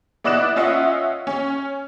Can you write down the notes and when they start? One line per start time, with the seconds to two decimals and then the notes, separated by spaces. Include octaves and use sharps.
0.24 B3 E4 D5 D#5 F#6 E7
0.56 C#4 F4 D#5 E5 F#5
1.27 C#4